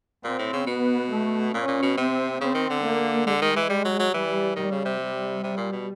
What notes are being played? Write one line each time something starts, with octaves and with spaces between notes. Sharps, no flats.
A#2 C4
A2
C#3
B2 B3
A3
A#2 C#4
A#2
B2
C3 C4
C#3 C4
D#3
D3
A#3
D3 G#3
D#3
E3
G3
F#3
F#3
E3 G3
D#3 G3
C#3
C3
G3
C3
A#2
B2